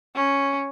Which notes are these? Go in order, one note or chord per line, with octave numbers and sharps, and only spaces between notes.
C#4